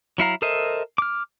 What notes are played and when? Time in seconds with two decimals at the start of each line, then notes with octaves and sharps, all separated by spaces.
0.18 F#3 E4 F5 A#5
0.42 A4 A#4 C5 D#5 E5
0.98 D6 F6